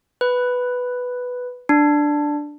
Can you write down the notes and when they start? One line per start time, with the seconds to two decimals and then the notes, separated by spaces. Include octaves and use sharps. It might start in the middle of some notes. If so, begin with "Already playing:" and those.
0.21 B4
1.69 D4